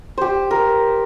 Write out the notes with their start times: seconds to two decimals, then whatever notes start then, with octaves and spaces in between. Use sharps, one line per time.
0.18 G4 C5
0.51 A#4